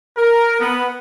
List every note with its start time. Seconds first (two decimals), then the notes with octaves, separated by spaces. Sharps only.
0.17 A#4
0.60 B3